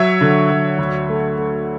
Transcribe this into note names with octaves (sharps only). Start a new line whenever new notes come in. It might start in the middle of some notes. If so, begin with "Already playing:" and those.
Already playing: F#3 C#5 E5
D3
F#3
D2
A3
A3